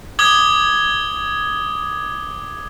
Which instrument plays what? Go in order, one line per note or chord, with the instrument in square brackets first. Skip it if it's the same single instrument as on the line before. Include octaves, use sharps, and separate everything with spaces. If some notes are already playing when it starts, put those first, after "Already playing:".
[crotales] D6 D#6 G#6 G7